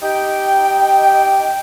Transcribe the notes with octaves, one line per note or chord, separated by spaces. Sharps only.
D#4 G4 G5